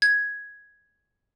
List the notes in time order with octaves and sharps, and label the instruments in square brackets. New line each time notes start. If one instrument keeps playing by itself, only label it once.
[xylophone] G#6